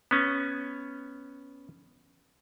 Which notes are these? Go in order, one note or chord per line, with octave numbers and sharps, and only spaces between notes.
B3 C#4